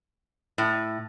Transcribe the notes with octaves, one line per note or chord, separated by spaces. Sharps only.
A2